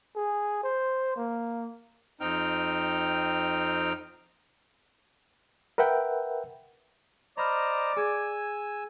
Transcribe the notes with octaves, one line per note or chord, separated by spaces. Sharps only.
G#4
C5
A#3
F2 C4 D#4 G5 F6
A#4 B4 E5 F#5 G5
C5 D5 D#5 A#5 B5 F6
G#4 G#5 E6 G#6